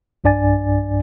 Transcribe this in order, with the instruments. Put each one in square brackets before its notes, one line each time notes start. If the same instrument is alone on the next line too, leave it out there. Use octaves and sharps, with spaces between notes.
[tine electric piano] B1 G2 D4 D5 G#5 A6